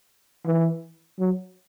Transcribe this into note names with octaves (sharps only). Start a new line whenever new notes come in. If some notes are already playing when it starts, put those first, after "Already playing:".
E3
F#3